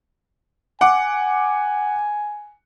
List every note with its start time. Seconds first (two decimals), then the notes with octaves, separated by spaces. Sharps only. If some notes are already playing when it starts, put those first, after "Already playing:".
0.81 F#5 G#5 D6